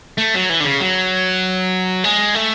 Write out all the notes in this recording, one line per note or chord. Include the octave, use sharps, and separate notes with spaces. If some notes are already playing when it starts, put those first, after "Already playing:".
A3
F#3
E3
D3
C#3
F#3
G#3
A3